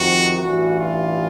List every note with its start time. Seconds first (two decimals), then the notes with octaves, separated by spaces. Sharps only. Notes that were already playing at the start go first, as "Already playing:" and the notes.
Already playing: F2 C3 D#3 F#4
0.37 A1 G2 E3 F#4
0.79 F4